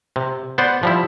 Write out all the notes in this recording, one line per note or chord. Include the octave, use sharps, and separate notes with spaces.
C3
B3 C5 D5 F#5
F3 G3 E4